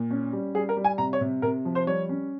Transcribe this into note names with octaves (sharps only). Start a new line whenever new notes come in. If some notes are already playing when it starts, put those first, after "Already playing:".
Already playing: A#2
C#4
G3
G3 G#4
A#4
G3
G#5
C3 A#5
C#5
C3
C3 A#4
F3
C5
G3 C#5
C#4